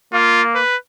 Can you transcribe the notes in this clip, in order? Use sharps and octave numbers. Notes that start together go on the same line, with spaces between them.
A#3 F4
B4